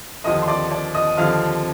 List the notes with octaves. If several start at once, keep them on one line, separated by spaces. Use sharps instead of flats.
D#2 D3 F3 D#5 D#6
C6
D5 D6
D5 D6
D#5 D#6
D#2 D3 F3 F5 F6